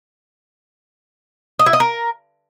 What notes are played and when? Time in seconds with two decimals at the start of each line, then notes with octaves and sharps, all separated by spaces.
1.59 D#5
1.66 E4
1.73 D#5
1.80 A#4